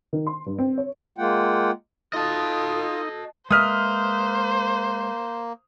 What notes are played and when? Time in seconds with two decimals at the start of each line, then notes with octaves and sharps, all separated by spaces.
0.13 D#3
0.27 C6
0.46 G2
0.59 C4
0.78 C#5
1.18 G#3 A#3 F4 F#5 G5
2.13 D#4 F4 A4 D#5 A5
3.51 G#3 A#3 B4 C5 E5 D#6 F6